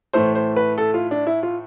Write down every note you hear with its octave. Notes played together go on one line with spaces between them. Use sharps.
A2 E3 A3 C5
C5
B4
A4
F4
D4
E4
F4